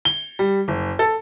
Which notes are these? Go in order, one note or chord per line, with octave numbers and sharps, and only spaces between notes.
G7
G3
F#1
A4